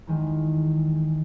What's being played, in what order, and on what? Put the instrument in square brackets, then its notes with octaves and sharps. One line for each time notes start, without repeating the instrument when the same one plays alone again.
[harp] E2 D#3 G#3